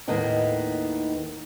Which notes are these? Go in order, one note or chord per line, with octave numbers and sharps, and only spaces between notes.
D#2 A2 A#3 B3 D#4 G5